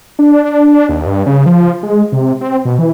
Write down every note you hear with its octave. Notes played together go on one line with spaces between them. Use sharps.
D4
D#2
G2
C#3
F3
G#3
C3
C4
B2
E3